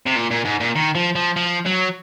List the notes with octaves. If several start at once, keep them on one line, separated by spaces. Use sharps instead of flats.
C3
A#2
A#2
G#2
A#2
D#3
F3
F3
F3
F#3